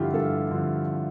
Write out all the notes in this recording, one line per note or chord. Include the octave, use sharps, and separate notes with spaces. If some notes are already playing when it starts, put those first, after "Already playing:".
Already playing: G2 D3 F3 E4 F4 G4
G2 A4
D3 F3